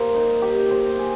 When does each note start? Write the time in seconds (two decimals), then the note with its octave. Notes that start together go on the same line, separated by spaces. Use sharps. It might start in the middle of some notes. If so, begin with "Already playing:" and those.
Already playing: A#3 G4 C5
0.15 D#4
0.42 G4
0.71 C5
0.99 G#4